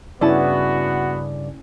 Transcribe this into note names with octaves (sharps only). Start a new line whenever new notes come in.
G2 C#3 B3 C#4 E4 F#4 D5 A5